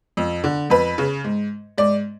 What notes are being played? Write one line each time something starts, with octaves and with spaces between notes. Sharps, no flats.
F2
D3
F2 B4
C#3
G#2
G#2 D5